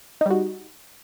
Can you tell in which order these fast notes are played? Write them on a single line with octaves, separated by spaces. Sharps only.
D#4 G3 F#4